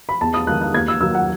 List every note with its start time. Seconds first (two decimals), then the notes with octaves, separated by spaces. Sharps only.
0.09 B5
0.21 E2 A5
0.34 D#6
0.47 D#3 G#3 F#6
0.61 F#6
0.74 D#2 G#6
0.88 E6
1.01 D#3 F#3 E6
1.15 F#5